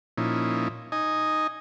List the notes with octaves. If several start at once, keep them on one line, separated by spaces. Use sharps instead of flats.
A#2 F3 C#4 D#4 E4
D#4 D#5 G#5